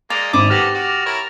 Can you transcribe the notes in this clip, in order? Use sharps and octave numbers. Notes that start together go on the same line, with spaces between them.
G#3 A#3 D5 A6 F7
G#1 E4 D6 D#6
B3 F#4 G4 A4 F6 A#6 F7
F#4 D5
E4 A#4 C#5